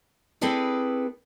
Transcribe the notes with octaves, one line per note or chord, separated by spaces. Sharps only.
C4 E4 G#4 A4 B4 D5